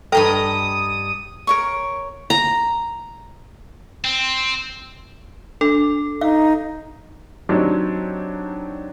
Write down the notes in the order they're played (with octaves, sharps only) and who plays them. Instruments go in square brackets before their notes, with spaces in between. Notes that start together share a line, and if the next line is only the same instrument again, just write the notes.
[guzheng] G2 D#5 A#5 [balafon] A4 [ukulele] G5 [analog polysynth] D#6
[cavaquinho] A#4 C#5 C#6
[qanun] A#5
[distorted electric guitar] C4
[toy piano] D4 [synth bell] A4
[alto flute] D#4 [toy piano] F5
[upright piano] F#3 C4 D4 D#4 G4 C#5